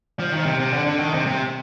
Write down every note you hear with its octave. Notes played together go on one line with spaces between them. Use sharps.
F3
D#3
C3
C3
D3
D3
D#3
C3
C3